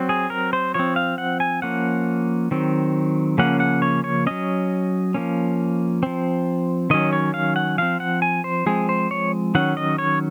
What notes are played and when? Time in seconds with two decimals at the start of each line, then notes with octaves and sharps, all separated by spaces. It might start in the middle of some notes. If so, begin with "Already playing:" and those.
Already playing: F#3 C4
0.09 G#4
0.30 A#4
0.53 C5
0.74 F3 C4 C#5
0.96 F5
1.18 F#5
1.40 G#5
1.62 F3 A#3 C#4 F#5
2.51 D#3 F#3 C4
3.38 C#3 F3 A#3 C#4 F#5
3.60 F#5
3.82 C#5
4.04 C#5
4.26 F#3 C#4 D#5
5.14 F3 A#3 C#4
6.03 F3 C4
6.90 D#3 F#3 C#4 D#5
7.13 C#5
7.34 F5
7.56 F#5
7.78 F3 C4 F5
8.00 F#5
8.22 G#5
8.44 C5
8.66 F3 G#3 C4 G#4
8.89 C5
9.11 C#5
9.55 D#3 F#3 C#4 F#5
9.77 D#5
9.98 C#5